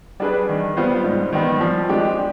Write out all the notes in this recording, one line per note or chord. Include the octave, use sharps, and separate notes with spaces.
G3 D4 G#4 B4
D#3
G3 B3 F4 C5
G#2
D#3 G3 B3
F3
G#3 D4 G4